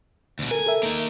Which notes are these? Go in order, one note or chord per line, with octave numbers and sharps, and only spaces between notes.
D2 B2
A4 A#4 G#5
A4 A#4 E5
A#3 D#4